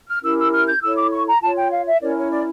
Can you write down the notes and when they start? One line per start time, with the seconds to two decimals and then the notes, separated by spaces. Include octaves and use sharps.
0.08 F6
0.23 C#4 E4 G4 A#4 E6
0.38 E6
0.53 F6
0.68 G6
0.83 E4 A4 C#5 E6
0.97 D6
1.13 C#6
1.28 A#5
1.42 F4 C#5 A5
1.57 G5
1.72 F5
1.87 E5
2.01 C#4 E4 A#4 C#5 D5
2.17 C#5
2.31 D5